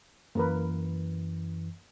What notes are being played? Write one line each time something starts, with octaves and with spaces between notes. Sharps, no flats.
F#2 E3 A#3 A#4 B4